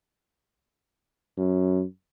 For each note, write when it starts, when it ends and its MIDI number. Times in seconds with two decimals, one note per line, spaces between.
1.38 1.83 42